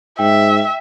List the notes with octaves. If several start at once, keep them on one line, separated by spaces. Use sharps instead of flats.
G#2 E5 G5